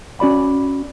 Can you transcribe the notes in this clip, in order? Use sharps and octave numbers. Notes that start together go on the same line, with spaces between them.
C#4 F#4 D5 B5